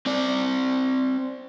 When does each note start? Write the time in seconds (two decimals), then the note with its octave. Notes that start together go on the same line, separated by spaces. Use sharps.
0.06 C4 D5